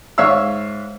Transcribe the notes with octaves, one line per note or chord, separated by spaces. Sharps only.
G#2 C#5 E5 F5 E6